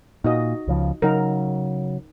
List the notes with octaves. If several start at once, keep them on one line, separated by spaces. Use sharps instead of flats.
A#2 D#4 F#4 D#5
C#2 C#3 F3
C#3 F#3 D#4 A#4